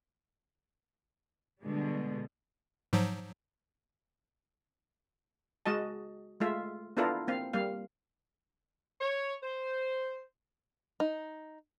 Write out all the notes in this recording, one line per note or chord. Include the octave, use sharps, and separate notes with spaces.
B2 D3 G3 G#3
G#2 F3 F#3
G#3 F#4 D#5 A5
G#3 A3 F4 E5
B3 D4 E4 F4 A4 A#4
A#3 C4 F5
G3 A#3 F5
C#5
C5
D#4